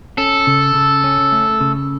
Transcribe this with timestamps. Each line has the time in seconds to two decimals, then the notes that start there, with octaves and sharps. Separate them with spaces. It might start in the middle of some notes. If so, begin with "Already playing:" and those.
0.18 C#4 A4
0.47 C#3
0.75 C#3
1.04 C#4
1.32 A3
1.61 C#3